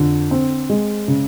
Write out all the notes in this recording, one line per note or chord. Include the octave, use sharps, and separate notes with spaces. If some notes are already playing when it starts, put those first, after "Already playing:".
Already playing: F2 D3
C4
G#3
C#3